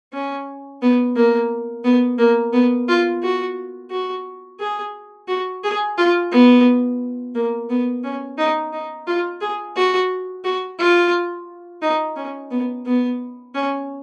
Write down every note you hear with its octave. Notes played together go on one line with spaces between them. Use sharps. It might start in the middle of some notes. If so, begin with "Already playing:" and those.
C#4
B3
A#3
B3
A#3
B3
F4
F#4
F#4
G#4
F#4
G#4
F4
B3
A#3
B3
C#4
D#4
D#4
F4
G#4
F#4
F#4
F4
D#4
C#4
B3
B3
C#4